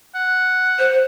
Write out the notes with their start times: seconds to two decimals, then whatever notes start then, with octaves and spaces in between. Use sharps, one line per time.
0.15 F#5
0.79 C5